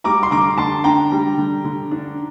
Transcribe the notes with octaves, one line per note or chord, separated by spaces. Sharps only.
G3 A#5 D6
C6
D3 A#5 D6
D3 A5 C6
D4 G5 A#5
G3
D3
D3
D4